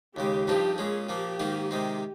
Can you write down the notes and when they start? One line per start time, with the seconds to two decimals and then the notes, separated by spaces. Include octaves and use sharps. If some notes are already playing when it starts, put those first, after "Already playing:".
0.16 D#2 C#3 G#3 G4
0.47 G2 F3 C4 D#4 G4
0.78 A#2 G#3 C#4 G#4
1.09 A#2 F3 A#3 G4
1.40 G#2 D#3 A#3 D#4
1.71 C3 D#3 G#3 C4 G4